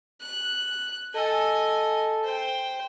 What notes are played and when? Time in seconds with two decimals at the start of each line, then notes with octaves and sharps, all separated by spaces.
0.21 F#6
1.14 A4 D#5 G#5
2.24 C5 G5